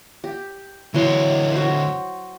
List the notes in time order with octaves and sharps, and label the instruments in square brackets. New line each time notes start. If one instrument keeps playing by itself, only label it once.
[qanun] G4
[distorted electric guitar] D2 C#5 [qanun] E3 F#3 C6
[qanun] F#4 C5